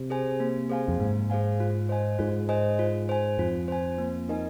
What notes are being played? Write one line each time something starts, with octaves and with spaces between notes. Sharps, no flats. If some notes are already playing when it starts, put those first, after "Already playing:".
Already playing: C3
G#4 C5 G#5
A#3
G#4 C5 F5 G#5
F2
G#2 A#3
G#4 C5 F5 G#5
F4
C5 D#5 G#5
G#2 F4
C5 D#5 G#5
F4
C5 G#5
F2 F4
C5 G#5
A#3
D#4 A#4 D#5 G#5